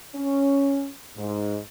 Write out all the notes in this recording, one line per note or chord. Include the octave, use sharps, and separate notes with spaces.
C#4
G#2